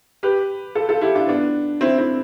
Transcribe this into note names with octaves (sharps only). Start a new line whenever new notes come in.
G4 B4
F4 A4
F4 A4
E4 G4
D4 F4
B3 D4
C4 E4
C4 E4